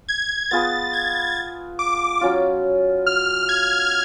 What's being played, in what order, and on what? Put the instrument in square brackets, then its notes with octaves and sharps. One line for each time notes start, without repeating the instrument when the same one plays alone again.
[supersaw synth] G#6
[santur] B3 F4 G#4 B4 [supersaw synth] A6
[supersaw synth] G#6
D6
[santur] F#3 C#4 F4
[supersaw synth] F6
G#6